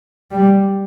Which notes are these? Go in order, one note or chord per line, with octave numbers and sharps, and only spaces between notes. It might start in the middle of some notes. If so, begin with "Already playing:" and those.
G3